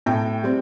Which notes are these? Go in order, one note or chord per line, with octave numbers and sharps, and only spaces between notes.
A2 G5
G3 C4